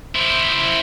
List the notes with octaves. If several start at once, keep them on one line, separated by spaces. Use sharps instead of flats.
E4 C5